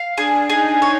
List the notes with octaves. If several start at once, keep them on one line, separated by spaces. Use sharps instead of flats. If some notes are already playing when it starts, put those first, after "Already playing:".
Already playing: F5
D4 G#4
D#4 G#4
C#5